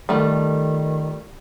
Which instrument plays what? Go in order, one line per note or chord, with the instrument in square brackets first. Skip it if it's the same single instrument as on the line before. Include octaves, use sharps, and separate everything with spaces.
[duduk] D#3 [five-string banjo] G3 A3 F4